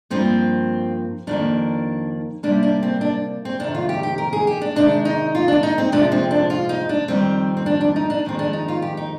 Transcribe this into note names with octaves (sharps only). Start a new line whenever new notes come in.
G2 F3 A#3 C4
F2 D#3 A#3 D4
C3 G3 A#3 D4
D4
C4
D4
C4
F2 C3 D#3 D4
F4
G4
G4
A#4
G#4
G4
D4
C3 D#3 G#3 D4
D#4
F4
D4
D#4
C4
F2 C3 F3 G#3 D4
C4
D4
F4
D#4
D4
F2 D#3 G3 C4
C4
D4
D4
D#4
D4
F2 D#3 G#3 C4
D4
D#4
F4
G4
D#4